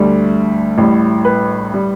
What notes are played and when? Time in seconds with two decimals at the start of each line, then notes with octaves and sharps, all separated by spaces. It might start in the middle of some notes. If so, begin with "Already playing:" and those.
Already playing: D2 D3 G3
0.78 A1 A2 G3
1.25 B4
1.74 G3